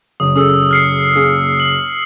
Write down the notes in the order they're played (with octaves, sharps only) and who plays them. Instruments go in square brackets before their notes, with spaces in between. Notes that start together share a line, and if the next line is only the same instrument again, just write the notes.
[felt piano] F#1 [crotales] D#6
[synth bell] C#4 G#4 A4 [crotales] D#6 E6
[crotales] F6 C7 C#7
[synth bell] A#3 C#4 G#4
[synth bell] C7 [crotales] F#7